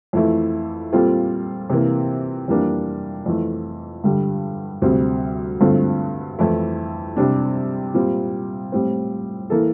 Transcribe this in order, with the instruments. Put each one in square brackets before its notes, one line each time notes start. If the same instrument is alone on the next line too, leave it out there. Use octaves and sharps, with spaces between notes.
[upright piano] F2 E3 A3 E4
A#2 G3 C4 F4 A4
C3 E3 A#3
F2 E3 G3 A#3 D4
F2 E3 A3
G2 D3 G3
D2 C3 G3 C4
G2 D3 A3 C4 F4
F2 E3 A3 E4
C3 G3 D4
A#2 G3 C4
A2 G3 C4
E3 A#3 E4 A4